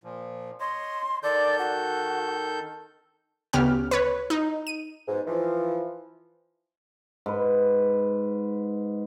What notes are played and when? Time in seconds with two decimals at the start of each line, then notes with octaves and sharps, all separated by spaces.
0.04 A#2 F3
0.60 C#5 D#5 C6
1.23 D#3 A4 D5 G6
1.59 F#4
3.53 D2 C#3 B3 G4 F6
3.91 B4 C#5
4.30 D#4
4.67 D#7
5.08 G#2 B2
5.27 E3 F3
7.26 G#2 B4